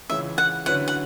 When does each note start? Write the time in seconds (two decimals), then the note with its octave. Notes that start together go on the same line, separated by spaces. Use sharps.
0.10 C#2 C#3 E3 G#3 C#4 E5
0.38 F#5
0.66 D3 F#3 C#4 E4 B4 F#5
0.88 F#5